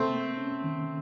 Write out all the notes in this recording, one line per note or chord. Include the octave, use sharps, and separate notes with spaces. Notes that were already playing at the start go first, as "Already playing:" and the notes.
Already playing: C3 A3 A#3 C4
A#3
C#4
D#3